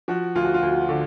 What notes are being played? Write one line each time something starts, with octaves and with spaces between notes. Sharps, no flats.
F3 F#4
D2 F4
F#4
F4
D2
D3